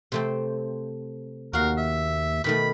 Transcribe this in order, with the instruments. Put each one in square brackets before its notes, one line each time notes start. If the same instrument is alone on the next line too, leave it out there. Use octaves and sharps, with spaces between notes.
[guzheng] C3 A3 C4
[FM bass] D#2 [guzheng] F#4 F5 [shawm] A#4
[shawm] E5
[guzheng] B2 D#3 A3 [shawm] B5